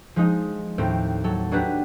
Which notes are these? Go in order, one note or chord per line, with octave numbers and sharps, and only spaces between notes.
F3 G#3 D#4
D#2 A2 C4
F#3 A4
F#3 A#3 D4 F#4 G4 B4